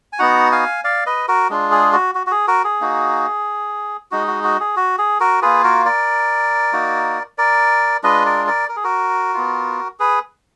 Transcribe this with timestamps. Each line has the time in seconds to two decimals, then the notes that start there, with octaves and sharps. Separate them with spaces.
0.13 G#5
0.19 B3 D#4 F#4 F#5 A#5
0.52 F5 G#5
0.84 D5 F5
1.06 B4 D#5
1.28 F#4 A#4
1.50 G#3 D4 F4
1.71 G#4
1.93 F#4
2.15 F#4
2.27 F#4
2.31 G#4
2.48 F#4 A#4
2.64 G#4
2.81 A#3 D#4 F#4
4.11 G#3 D#4 F#4
4.27 F#4
4.44 F#4
4.60 G#4
4.76 F#4
4.99 G#4
5.20 F#4 A#4
5.42 A#3 F4 G#4 B4
5.64 F#4 A#4
5.85 A#4 D5
6.73 A#3 D#4 F#4
7.38 A#4 D5
8.03 G#3 D4 F4 B4 D#5
8.25 A#4 D5
8.47 A#4 D5
8.69 A#4
8.76 G#4
8.84 F#4 A#4
9.34 B3 F4
10.00 G#4 B4